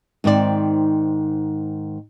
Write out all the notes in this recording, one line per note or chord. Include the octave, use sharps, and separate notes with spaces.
G#2 D#3 C4 D5